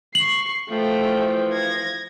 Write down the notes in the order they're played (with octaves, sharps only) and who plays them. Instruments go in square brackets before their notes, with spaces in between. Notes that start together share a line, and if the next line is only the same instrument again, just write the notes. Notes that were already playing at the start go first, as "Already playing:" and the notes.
[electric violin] C#6 C7 [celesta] F#7
[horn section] E3 F3 [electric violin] A3 G5
[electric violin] G#6 A#6